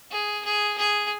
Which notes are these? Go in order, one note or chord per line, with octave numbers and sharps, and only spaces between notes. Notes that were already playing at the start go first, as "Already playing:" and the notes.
G#4
G#4
G#4